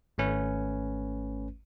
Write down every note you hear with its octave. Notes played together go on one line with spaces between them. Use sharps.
G#1 A3 C#4 B4